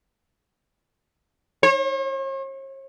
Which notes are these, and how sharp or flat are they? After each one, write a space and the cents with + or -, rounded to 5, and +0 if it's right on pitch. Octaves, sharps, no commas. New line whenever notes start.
C#5 -45